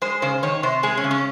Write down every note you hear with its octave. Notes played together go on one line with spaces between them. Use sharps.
G#3 C5
C#3 C5
D#3 C#5
C3 C5
G#3 G#4
C#4
C#3
C#4